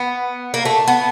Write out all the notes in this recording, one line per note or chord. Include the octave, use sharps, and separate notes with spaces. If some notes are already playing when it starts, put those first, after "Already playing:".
Already playing: B3
A#3
A3
B3